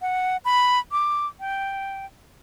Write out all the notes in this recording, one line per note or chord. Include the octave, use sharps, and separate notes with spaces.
F#5
B5
D6
G5